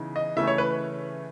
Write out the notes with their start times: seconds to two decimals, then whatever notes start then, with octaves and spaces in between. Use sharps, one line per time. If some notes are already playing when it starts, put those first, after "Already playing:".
Already playing: C#3 E3 B3 D#4
0.16 D#5
0.37 C#3 E3 A3 C#4 E5
0.47 C#5
0.58 B4